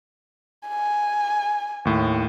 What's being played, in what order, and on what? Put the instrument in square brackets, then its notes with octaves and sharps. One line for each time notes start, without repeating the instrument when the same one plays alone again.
[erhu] G#5
[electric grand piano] D#2 A2